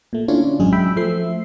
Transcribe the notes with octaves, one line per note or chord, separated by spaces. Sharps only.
A#2 A3
D3 C#4 D4 E4 F4 C#5
A1 F#2 G#3 G#4
E5 G5 B5
F3 A3 C5 E5 C7